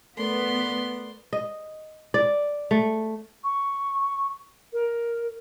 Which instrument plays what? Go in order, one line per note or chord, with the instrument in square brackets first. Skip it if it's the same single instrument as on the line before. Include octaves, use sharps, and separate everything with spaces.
[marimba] A3 A4 A#4 [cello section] B3 [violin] D5 C6
[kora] D#5
D5
A3
[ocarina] C#6
A#4